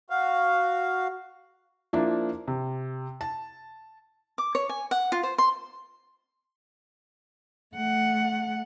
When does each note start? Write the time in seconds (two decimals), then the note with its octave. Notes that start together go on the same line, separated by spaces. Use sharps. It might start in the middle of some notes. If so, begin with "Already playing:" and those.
0.10 F#4 F5
1.93 F3 A#3 D4 E4
2.48 C3
3.21 A5
4.38 D6
4.55 C#5
4.69 G#5
4.91 F#5
5.12 F4
5.23 C5
5.38 C6
7.75 A3 F#5